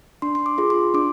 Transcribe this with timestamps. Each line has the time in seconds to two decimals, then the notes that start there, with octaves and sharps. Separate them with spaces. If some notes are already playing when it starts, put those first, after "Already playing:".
0.22 D4 C6
0.35 C6
0.46 D6
0.58 F4 G#4
0.70 C6
0.94 D4 D6